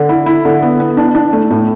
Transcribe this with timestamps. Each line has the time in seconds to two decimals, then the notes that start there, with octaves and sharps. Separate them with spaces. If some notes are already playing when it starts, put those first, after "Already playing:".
Already playing: D3
0.09 E4
0.26 E4
0.45 D3
0.62 B3
0.80 B3
0.97 D4
1.15 D4
1.33 A3
1.50 A2